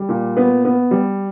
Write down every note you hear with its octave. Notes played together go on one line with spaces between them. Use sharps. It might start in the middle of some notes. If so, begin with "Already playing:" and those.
Already playing: G3
A#2
B3
B3
G3